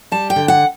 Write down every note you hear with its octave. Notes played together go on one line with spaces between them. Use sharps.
G3 A5
G5
D3
F#5